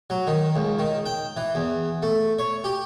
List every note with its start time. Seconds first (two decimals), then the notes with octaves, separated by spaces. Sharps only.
0.10 F#3
0.27 D#3
0.56 C#2
0.79 D#3
1.06 G5
1.37 E3
1.55 E2
2.03 A3
2.39 C#5
2.64 G4